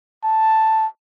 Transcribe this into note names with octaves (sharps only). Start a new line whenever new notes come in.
A5